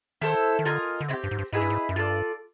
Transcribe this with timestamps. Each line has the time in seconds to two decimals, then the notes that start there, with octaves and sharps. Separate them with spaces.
0.21 D#3 E4 A4 C5
0.59 D#3
0.65 D3 F4 A#4 D#5 G#5
1.00 D3
1.08 C#3 C4 E4
1.13 G4
1.24 G2
1.31 G#2
1.38 G2
1.53 G#2 E4 G#4 B4 D#5
1.61 G2
1.70 G#2
1.89 F#2
1.96 G2 F4 A4 D5